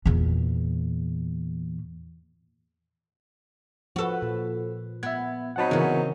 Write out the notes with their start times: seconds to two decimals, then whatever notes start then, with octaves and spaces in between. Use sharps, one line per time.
0.06 E2 A#2
3.96 F3 F#4 A4 B4
4.22 A#2
5.03 B3 E5 G#6
5.56 F#3 C4 D#4 F#5 A5 B5
5.71 C#3 E3 B3 C#4 A#4